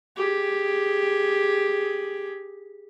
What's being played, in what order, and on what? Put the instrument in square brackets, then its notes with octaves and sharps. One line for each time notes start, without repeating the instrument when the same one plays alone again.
[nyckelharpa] G4 G#4